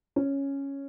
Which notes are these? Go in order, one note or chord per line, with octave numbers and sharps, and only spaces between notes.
C#4